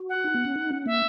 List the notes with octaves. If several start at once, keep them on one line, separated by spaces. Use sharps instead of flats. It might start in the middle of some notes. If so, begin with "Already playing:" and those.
Already playing: F#4
F#5
D#4
B3
C#4
D#4
C#4
A#3 E5